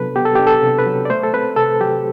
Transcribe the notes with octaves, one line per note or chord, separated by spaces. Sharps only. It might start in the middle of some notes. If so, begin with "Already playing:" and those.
Already playing: C3 F#3 B3 D4 A4 B4
B3 G4
A4
G4
D4
A4
C3
B4
F#3
D5
A3 C5
A4
C4 B4
C3 A4
F#3 G4